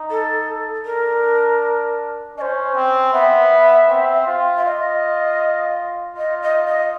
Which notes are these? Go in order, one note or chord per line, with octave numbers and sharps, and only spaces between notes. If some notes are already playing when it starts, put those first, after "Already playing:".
Already playing: D#4
A4
D4 A#4
C#4 C5 D#5
C4
B3 E5
C4
F4
E5
F4 D#5
F4 D#5
D#5
D#5